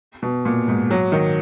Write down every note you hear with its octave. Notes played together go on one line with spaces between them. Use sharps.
B2
A#2
G#2
F#3
D#3